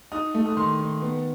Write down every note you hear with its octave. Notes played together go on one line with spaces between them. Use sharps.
D#4 D#6
A3
D#6
D#3 C6
D#3
B3